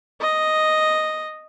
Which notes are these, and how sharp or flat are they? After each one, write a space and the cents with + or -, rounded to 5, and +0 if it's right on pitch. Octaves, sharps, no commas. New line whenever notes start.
D#5 +0